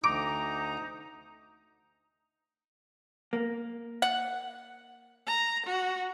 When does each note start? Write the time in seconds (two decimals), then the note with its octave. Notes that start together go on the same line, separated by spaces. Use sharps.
0.04 D2 D#4 A#5 D6
3.33 A#3
4.02 F#5
5.27 A#5
5.66 F#4